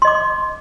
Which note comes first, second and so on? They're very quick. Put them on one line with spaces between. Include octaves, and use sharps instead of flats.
C6 D#5 D6